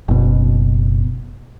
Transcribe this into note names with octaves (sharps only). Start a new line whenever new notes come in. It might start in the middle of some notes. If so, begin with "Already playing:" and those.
F#1 B2